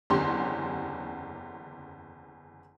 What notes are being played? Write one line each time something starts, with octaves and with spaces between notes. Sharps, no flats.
F#1 E2 D3 C#4 G4 C6